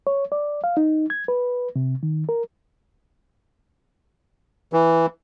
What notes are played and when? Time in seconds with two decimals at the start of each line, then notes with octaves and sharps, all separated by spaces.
0.07 C#5
0.32 D5
0.64 F5
0.77 D#4
1.10 G#6
1.28 B4
1.76 C3
2.03 D#3
2.29 A#4
4.73 E3